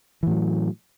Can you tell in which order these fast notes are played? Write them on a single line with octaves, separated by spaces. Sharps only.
E3 A2 F#3